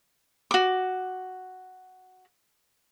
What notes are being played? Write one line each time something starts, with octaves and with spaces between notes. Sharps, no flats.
F#4 D6